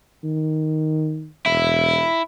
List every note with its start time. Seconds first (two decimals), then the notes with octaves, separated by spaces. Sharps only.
0.24 D#3
1.46 E1 E4